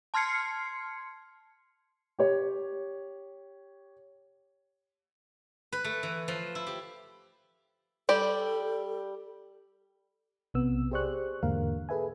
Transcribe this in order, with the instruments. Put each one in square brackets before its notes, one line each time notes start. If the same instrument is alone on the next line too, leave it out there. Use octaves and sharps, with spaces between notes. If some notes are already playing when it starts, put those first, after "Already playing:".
[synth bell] A5 C6 F6 G#6 C7 C#7
[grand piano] G4 C#5
[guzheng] B4
A3
E3
F3
E4
G4
[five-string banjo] G3 G4 D5 [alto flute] A4
[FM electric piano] B1 C3 B3 E6
G4 G#4 C5 D5 C#6 F#6
E2 G#2 D3 A#3 A#4 F5
G#4 A4 B4 E5 G#5